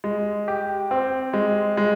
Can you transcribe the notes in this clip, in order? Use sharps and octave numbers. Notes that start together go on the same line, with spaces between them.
G#3
G4
C4
G#3
G#3